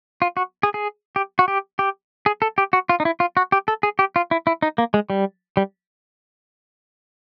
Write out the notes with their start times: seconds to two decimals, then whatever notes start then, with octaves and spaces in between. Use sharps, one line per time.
0.22 F4
0.37 F#4
0.63 G#4
0.74 G#4
1.16 G4
1.39 F#4
1.48 G4
1.79 G4
2.26 G#4
2.42 A4
2.58 G4
2.73 F#4
2.89 F4
3.00 D#4
3.05 E4
3.20 F4
3.37 F#4
3.52 G4
3.68 A4
3.83 G#4
3.99 G4
4.16 F4
4.31 E4
4.47 E4
4.62 D#4
4.78 A#3
4.94 G#3
5.10 G3
5.57 G3